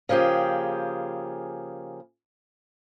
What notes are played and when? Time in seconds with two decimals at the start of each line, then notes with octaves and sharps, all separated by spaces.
0.09 C#3 F3 A#3 G4 G#4